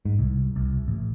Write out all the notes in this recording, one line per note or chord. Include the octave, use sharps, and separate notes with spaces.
G#2
C2
C2
A1